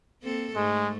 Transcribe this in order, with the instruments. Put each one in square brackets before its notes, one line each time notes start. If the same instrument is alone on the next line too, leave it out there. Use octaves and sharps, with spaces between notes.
[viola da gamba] A#3 C4 A4
[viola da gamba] G#2 A3 [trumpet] G#3